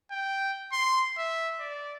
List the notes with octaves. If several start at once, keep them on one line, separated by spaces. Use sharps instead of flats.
G5
C6
E5
D5